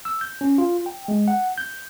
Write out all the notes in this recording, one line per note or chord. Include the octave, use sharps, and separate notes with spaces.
E6
G6
C#4
F4
G5
G#3
F#5
G6